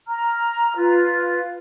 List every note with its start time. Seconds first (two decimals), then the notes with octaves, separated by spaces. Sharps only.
0.08 A#5 F6
0.77 F4 B4